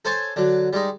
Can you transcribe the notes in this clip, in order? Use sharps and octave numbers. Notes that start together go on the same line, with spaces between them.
A4 C5 C#5 G#5 A5 C#6
D3 F#3
G3 G#3 D#4